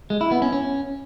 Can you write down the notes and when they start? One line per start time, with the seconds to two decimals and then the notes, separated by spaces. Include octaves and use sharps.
0.10 G#3
0.21 E4
0.31 B3
0.42 C#4
0.53 C#4